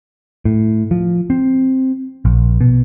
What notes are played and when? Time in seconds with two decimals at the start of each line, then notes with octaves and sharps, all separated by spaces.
0.45 A2
0.91 F3
1.30 C4
2.25 A#1
2.61 B2